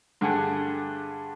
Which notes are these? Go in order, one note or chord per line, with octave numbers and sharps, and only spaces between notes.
G2 D3 G4 G#4 F#5 G#5